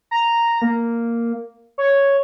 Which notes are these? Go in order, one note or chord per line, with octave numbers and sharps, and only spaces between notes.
A#5
A#3
C#5